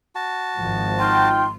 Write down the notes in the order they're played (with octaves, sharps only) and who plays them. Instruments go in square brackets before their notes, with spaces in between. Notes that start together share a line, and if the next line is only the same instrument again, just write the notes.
[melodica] F#4 A5
[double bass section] G#1 F3
[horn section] D#4 F4 G5 [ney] C6